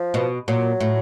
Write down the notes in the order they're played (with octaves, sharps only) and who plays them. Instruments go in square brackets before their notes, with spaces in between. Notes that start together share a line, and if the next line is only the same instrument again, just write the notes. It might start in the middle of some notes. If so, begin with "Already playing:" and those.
Already playing: [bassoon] F3
[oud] B2
[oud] A#2 [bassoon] F#3
[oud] A2